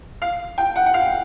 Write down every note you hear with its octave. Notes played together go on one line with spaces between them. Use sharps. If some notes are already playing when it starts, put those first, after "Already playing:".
F5
G5
F#5
F#5
F5